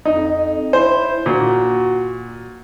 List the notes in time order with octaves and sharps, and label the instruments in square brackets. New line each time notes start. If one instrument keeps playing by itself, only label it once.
[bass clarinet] F2 [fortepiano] D#4
[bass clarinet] E4 [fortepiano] C5
[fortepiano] A#2 [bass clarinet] F#4